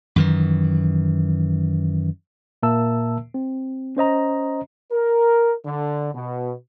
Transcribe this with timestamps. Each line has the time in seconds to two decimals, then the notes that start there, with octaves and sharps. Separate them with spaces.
0.16 F#2 D#3 E3
2.63 A#2 A#3 A#4 E5 A5 E6
3.34 C4
3.97 C#4 C5 D#5 A#5
4.92 A#4
5.65 D3
6.14 B2